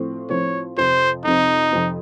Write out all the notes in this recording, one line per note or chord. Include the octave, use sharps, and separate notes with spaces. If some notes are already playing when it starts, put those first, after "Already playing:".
Already playing: A2 F3 C4
A2 F3 C4 C#5
F2 C3 F3 C4 C5
F2 C3 F3 C4 D#4
F2 C3 F3 C4